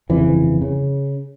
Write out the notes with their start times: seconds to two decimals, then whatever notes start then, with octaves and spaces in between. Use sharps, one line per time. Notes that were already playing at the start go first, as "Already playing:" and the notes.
0.09 G1 F2 C#3 E3
0.62 C#3